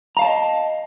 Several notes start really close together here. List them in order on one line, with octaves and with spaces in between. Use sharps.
A#5 F5 A5 D5 D#5